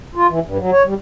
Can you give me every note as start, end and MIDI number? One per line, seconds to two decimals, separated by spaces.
0.15 0.27 65
0.28 0.39 52
0.45 0.58 43
0.58 0.71 54
0.72 0.83 73
0.85 0.94 55